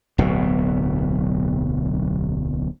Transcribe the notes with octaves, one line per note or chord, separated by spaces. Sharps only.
D1 B1 B2